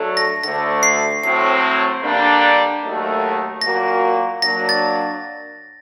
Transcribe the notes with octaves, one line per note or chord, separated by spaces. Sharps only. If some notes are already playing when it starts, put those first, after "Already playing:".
Already playing: F#3 A3 D4 A4
A#6
D2 D3 A3 A#6
C7
A2 F#3 A3 C4 C7
D3 G3 A#3 D4
D#2 D#3 F#3 A3
A#2 F#3 A#3 F#4 A#6
F#3 A#3 D4 A#6
A6